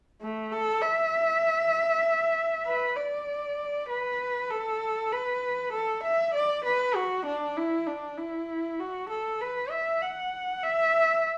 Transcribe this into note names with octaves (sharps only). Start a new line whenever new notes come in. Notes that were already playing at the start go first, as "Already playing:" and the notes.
A3
A4
E5
B4
D5
B4
A4
B4
A4
E5
D5
B4
F#4
D4
E4
D4
E4
F#4
A4
B4
E5
F#5
E5